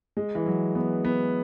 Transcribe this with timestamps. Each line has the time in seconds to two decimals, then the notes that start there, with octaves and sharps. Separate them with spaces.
0.17 G#3
0.35 E3
0.46 F#3
0.75 B3
1.05 B3